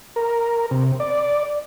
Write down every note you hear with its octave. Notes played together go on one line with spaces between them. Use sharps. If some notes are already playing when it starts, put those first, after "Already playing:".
A#4
C3
D5